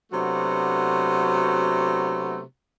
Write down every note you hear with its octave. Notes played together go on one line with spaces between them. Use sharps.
C3 F#3 A3 B3 D4 F#4